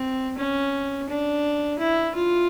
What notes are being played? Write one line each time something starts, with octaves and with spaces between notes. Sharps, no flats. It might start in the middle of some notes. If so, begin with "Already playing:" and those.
Already playing: C4
C#4
D4
E4
F4